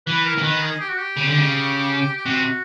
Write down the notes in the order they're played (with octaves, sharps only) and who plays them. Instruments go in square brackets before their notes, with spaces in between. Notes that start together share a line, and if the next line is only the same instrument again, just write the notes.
[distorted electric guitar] E3 [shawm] B4
[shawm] A#4
[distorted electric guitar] E3
[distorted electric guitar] D#3 [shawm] B4
[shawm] G#4
G4
F#4
G4
[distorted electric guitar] C#3
D3
C#3
[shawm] G4
[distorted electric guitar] C3 [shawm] F#4